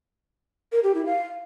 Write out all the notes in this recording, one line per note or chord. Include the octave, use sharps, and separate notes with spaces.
A#4
G4
E4
F5